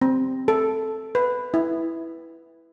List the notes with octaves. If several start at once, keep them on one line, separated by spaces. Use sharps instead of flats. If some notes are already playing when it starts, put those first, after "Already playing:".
C4
A4
B4
E4